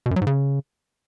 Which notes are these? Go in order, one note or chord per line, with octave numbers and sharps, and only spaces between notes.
B2
F#2
F#3
G#2
C#3